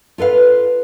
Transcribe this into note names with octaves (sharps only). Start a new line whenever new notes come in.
F4 A4 B4 F5